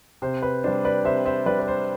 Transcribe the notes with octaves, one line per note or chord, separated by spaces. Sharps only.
C3 C5
B4
G3 D4 C5
B4 D5
C3 C5 E5
C5 E5
G3 D4 B4 D5
B4
C5